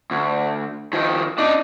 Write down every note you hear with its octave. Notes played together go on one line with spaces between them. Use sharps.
D2
D#3 F3
D4 D#4